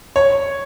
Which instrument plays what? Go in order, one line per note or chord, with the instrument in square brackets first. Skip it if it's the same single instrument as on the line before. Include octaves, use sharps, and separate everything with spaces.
[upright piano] C#5